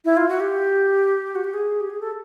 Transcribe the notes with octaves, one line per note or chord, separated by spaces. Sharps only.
E4
F4
F#4
G4
F#4
G4
G#4
G4
G#4
A4